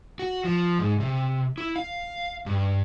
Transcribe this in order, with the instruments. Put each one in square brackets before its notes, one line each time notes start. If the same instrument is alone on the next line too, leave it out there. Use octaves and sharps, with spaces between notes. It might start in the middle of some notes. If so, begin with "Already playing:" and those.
[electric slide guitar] F#4
F3
G#2
C3
E4
F5
G2